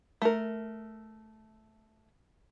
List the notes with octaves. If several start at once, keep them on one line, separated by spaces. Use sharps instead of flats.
A3 A#4